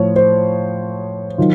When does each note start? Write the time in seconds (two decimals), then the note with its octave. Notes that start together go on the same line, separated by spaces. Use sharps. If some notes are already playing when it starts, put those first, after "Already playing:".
Already playing: A2 F3 C#5
0.16 C5
1.38 D#3 F#3 F4